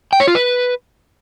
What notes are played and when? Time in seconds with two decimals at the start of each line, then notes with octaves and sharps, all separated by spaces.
0.13 G5
0.20 C#5
0.27 F4
0.35 B4